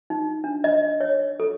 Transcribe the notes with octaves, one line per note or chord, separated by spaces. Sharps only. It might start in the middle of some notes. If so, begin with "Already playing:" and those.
D#4
D4
D#5
C#5
A4